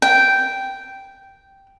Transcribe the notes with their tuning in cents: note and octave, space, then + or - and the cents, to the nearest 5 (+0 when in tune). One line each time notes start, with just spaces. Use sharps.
G5 -5